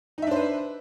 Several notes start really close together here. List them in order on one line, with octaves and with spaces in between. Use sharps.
D#4 E5 D4 C5 B4